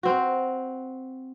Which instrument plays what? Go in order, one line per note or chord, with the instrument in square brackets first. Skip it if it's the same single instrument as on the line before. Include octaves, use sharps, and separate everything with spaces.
[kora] C4 F#4